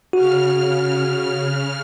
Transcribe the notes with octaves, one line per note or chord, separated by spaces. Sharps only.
C#3 F#4 F6